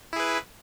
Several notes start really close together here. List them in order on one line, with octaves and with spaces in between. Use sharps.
E4 G#4 B4